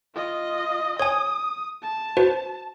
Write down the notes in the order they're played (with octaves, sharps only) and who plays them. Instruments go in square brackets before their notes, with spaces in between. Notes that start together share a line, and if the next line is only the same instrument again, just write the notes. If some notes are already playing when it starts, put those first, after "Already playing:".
[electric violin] F4 D#5
[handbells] C#5 G#5 [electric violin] D#6
[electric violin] A5
[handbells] F#4 B4 C5